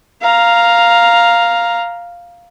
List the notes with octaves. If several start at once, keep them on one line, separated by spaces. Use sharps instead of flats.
F5 A#5